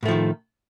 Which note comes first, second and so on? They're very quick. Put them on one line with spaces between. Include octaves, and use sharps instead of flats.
A2 A3 F3 D#3